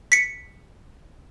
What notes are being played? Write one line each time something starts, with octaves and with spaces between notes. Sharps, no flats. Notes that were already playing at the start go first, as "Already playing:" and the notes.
B6 C#7